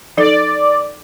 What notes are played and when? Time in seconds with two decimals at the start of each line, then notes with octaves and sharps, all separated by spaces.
0.17 F3 D#4 A4 D5